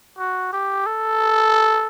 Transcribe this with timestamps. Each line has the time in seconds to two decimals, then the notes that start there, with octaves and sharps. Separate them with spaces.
0.18 F#4
0.53 G4
0.86 A4